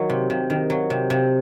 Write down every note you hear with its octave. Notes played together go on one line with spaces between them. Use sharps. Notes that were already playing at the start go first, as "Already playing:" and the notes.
Already playing: D#3 F#3
C3
C3
D#3
F#3
C3
C3